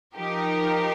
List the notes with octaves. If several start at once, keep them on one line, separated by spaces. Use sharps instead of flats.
F3 D#4 G4 A#4